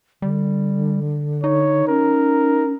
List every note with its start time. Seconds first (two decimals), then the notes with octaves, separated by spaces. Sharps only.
0.22 D3 G3
1.44 D#4 C#5
1.88 C#4 A#4